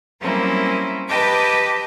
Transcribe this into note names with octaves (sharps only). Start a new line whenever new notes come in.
F#3 G3 A#3 C4 C#4 E4
G4 B4 D#5 G5 A5 D6